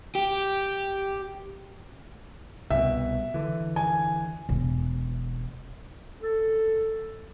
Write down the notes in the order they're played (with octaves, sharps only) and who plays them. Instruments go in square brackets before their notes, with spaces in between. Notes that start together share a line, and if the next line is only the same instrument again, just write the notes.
[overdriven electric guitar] G4
[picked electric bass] C2 B2 [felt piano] E5
[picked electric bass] D3 E3
[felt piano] G#5
[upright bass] E1
[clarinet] A4